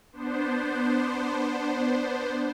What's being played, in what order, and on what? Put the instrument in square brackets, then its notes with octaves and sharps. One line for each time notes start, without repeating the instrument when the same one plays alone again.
[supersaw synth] B3 D4 C5